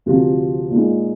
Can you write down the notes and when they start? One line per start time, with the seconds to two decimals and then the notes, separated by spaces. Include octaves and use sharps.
0.06 D2 C3 F3 C4 G4
0.71 A#2 G#3 D#4